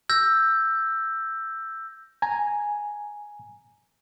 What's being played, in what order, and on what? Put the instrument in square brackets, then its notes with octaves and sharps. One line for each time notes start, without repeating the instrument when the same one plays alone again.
[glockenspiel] E6 G6 A#6
[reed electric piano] G#5 A#5